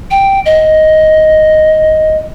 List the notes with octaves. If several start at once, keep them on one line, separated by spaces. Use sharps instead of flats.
G5
D#5